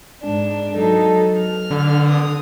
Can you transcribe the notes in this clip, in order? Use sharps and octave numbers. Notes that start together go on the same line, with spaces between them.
G#2 D4
F#3 D#4 A4
F6
D3
D#6